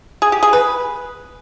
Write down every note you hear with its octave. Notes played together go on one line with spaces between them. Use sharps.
G#4
G4
G#4
B4